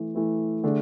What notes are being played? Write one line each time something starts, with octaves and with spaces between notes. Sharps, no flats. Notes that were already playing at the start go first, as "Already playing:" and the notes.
Already playing: E3 A3 E4
E3 A3 E4
D3 A3 D4 G#4